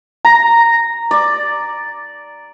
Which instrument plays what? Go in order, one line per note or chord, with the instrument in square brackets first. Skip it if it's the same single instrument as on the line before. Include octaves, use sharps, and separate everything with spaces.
[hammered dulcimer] A#5
D5